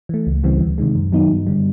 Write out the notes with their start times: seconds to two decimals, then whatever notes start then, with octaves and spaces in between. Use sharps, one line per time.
0.09 E3 A3
0.27 C#2
0.44 C#3 E3 G3 C4
0.61 D2
0.78 C3 D#3 G#3
0.95 F#2
1.12 D#3 F#3 B3 D#4
1.30 G2
1.47 D3 G3